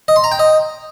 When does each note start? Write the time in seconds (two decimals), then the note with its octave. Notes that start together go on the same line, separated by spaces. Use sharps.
0.08 D#5
0.16 C6
0.24 A#5
0.32 G5
0.39 D#5